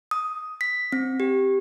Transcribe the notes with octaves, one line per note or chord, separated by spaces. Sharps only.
D#6
B6
C4
G4